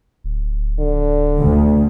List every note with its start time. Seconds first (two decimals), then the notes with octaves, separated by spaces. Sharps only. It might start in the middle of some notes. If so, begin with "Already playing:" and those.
0.24 D1
0.79 D3
1.41 D2